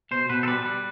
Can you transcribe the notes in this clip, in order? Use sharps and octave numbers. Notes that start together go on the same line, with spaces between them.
B2 C5
B2 B4
A4
G3 B4
G3